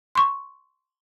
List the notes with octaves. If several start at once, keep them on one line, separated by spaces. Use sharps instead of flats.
C6 C#6